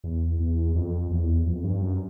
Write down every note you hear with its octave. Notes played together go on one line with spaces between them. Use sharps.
E2
E2
F2
E2
F2
G2
F#2